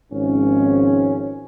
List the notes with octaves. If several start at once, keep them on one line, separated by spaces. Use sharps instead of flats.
G#1 G#2 F3 C#4